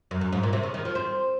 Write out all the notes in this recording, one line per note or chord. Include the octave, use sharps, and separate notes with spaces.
F#2
F#2
G#2
A#2
C3
C#3
D#3
F3
C4